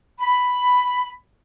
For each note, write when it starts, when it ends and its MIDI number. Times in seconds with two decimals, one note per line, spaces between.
0.21 1.12 83